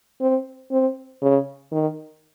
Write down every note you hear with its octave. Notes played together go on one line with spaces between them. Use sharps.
C4
C4
C#3
D#3